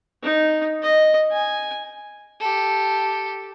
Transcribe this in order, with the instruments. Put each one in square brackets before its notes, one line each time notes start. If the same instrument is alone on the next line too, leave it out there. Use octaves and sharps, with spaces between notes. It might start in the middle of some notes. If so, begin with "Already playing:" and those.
[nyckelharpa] D#4
D#5
G#5
[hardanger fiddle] G4 A4